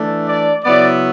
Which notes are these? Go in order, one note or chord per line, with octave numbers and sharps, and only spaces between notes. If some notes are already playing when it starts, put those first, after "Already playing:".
Already playing: E3 A3 D4
D5
C#3 F#3 B3 E4 D5